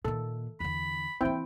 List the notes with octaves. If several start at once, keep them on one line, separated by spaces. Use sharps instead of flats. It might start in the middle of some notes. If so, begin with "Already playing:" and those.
A#2 D#3 A4
E2 D3 B5
E3 A#3 C4 E4 G5